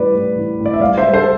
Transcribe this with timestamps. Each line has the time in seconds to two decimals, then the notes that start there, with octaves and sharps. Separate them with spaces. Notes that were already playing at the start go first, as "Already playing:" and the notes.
Already playing: A2 E3 G3 B4 D5
0.15 A2
0.37 E3
0.59 A2
0.66 D5
0.74 E5
0.80 G3 D5 F5
0.98 C5 E5
1.02 G3
1.14 A4 C5